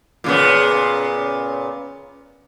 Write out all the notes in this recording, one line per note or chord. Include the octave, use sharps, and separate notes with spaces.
A#2 C#3 B3